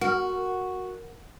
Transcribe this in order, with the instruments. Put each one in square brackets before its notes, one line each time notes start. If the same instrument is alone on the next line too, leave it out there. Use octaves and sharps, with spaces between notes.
[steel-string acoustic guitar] F#4 [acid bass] A#4